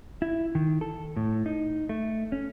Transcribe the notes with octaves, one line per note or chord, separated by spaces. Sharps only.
E4
D#3
A4
A2
D#4
A3
C#4